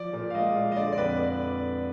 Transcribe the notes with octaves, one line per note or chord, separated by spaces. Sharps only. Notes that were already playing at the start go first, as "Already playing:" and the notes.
Already playing: F3 D5
A#2
F5
G#3 D#5
A#2
D#5
D3 D5
D5
F2 B4